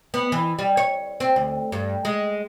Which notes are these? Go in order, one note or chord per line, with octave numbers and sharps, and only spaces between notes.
B3
E3
G3
C#5
C4
D2
G2
G#3